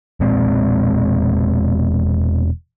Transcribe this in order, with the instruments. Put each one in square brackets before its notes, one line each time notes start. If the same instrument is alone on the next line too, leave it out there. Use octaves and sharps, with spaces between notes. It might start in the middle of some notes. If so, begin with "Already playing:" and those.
[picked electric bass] E1 A#2 G#3 C4